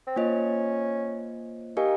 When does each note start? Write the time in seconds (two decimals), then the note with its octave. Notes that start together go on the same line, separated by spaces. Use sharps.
0.07 C4
0.16 A#3 C#4 F4 C5 D#5
1.77 D#4 G4 A#4 F5 G#5